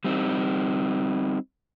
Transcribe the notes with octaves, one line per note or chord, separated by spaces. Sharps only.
G3 C4 D#4